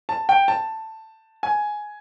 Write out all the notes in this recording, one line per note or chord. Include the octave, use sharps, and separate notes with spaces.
A5
G5
A5
G#5